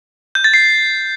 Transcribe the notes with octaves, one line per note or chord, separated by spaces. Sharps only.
G6
A6
C7